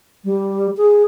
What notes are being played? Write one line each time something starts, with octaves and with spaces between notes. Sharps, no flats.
G3
G#4